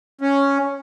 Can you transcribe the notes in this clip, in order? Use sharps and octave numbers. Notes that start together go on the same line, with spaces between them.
C#4